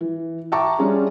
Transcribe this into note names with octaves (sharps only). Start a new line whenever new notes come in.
E3
E5 G5 A5 A#5 C#6 D6
G3 C#4 D4 F4 G#4